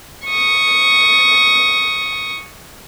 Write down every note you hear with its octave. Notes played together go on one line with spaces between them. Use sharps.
C#6 D#6